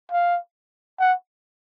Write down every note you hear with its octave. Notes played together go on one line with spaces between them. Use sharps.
F5
F#5